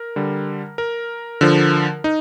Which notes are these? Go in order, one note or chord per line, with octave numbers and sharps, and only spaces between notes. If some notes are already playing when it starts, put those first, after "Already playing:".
Already playing: A#4
D3 G3
A#4
D3 F3
D#4